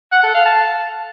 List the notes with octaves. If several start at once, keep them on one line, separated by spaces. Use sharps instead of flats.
F#5
A4
F5
A5